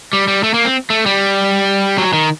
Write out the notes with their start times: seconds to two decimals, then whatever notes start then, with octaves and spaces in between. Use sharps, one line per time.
0.13 G3
0.28 G3
0.44 A3
0.54 A#3
0.65 C4
0.90 A3
1.06 G3
1.98 F#3
2.13 D#3